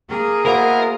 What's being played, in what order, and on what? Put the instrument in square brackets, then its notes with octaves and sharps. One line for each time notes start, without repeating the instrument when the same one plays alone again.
[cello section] A#3 G#4 [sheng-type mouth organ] A#4
[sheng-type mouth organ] B3 E4 [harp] F#4 C5 F5 [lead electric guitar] A#4